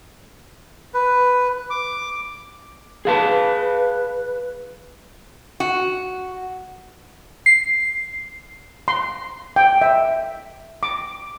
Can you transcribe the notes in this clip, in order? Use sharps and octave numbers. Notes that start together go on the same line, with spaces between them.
B4
D6
G#4 B4 F5 A5
F#4
C7
C6
G5
E5
D6